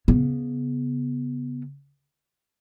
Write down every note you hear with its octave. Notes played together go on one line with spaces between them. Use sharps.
C#3 B3